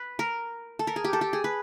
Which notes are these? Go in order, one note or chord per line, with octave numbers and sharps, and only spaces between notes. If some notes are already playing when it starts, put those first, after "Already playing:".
Already playing: B4
A#4
A4
A#4
G#4
G4
A4
G4
G#4
B4